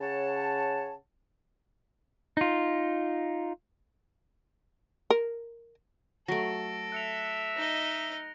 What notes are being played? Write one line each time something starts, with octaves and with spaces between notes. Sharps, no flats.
C#3 C#5 F#5 A5
D#4 F4
A#4
F#3 A3 A4 A#6 D7
E5 F#6 C#7 F7
D#4 D#5 A#6